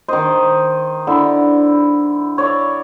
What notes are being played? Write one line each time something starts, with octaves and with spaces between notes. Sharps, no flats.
D#3 C5 D#5
D3 E4 E6
C#5 D5 E5